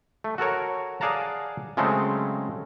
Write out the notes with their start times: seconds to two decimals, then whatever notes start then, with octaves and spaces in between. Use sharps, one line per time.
0.24 A3
0.38 F#4 A4 A#4 C#5
1.01 G#4 D5 F5 F#5 A5 A#5
1.77 C#3 F#3 G#3 A3 C4 A4